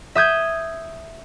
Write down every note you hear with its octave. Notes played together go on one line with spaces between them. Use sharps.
E5 D#6 G6 G#6